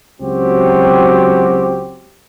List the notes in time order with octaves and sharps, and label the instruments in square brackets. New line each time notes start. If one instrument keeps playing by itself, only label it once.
[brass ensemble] C#2 F#3 C4 F#4 G4